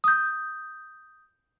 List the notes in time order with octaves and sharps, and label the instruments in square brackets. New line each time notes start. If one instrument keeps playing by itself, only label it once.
[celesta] D#6 G6